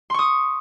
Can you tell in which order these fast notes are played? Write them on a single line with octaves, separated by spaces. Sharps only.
C6 C#6 D#6